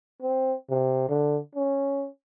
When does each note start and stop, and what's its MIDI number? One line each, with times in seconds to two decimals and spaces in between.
0.22 0.54 60
0.70 1.09 48
1.09 1.38 50
1.56 2.08 61